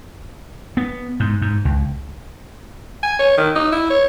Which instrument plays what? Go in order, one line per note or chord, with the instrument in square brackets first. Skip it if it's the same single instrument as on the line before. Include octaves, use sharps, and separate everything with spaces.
[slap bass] B3
G#2
G#2
C#2
[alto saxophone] G#5
C#5
D#3
D#4
E4
C#5